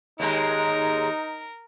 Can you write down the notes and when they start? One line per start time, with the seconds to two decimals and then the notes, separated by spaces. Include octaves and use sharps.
0.20 D#2 G#3 D#4 A#4